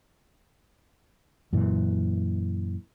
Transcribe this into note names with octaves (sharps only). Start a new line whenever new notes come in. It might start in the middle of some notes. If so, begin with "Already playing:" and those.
F#2 A#2 E3